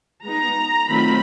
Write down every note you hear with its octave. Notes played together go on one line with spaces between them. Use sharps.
G#3 B3 D#4 A#5
D#3 F#3 A3 C4 F4 B5